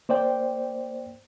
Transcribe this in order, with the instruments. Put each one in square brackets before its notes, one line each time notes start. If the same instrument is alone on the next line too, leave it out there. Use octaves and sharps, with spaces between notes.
[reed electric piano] A#3 C5 D5 G5